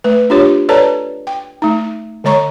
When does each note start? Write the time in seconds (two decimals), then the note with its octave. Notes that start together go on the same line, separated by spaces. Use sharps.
0.04 A3 B4
0.30 D4 F4 G4 C#5
0.69 A4 B4 C#5 D5 A5 A#5
1.27 G5
1.62 A3 D#4
2.24 D3 G#3 C#5 A#5 C#6